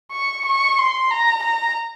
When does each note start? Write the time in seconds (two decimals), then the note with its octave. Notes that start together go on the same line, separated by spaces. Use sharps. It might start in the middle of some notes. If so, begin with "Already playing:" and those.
0.12 C#6
0.46 C#6
0.79 C6
1.11 A#5
1.43 A#5